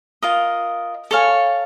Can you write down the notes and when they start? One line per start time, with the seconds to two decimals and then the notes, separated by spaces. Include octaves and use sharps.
0.22 F4 A#4 D#5
1.11 A4 C#5 F5 G#5